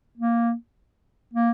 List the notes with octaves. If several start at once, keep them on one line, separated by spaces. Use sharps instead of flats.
A#3
A#3